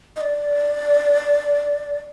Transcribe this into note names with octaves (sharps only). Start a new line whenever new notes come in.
D#5
D5